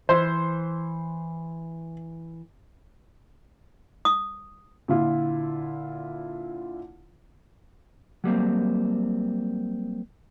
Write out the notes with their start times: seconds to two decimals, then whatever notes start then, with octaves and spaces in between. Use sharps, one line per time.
0.09 E3 C5
4.05 D#6
4.88 A#2 D3 E4 F4
8.24 F#3 G3 A#3 C4